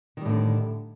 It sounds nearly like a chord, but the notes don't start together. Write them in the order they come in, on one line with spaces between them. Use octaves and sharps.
D#3 G3 A2 D3